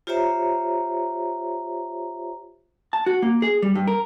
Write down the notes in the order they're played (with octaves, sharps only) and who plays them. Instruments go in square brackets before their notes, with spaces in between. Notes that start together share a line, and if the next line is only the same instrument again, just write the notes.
[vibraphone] F4 G4 C5 C#5 E5 A#5
[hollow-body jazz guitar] A5
F#4
A#3
G#4
G3
G2
A#4